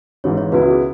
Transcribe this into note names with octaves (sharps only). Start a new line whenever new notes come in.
G#1 G#2 E3 G#3 C#5
C#5
C#2 B2 B3 E4 B4
F#4
G#4